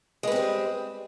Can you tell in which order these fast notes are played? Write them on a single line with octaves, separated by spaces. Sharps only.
G#3 B4 C4 G3